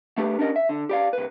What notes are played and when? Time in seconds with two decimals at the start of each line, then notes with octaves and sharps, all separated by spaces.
0.18 A3 D4 G4 B4
0.39 C#4 D4 G4 A#4 D#5
0.56 E5
0.69 D3
0.89 G4 D5 F5
1.13 C2 B4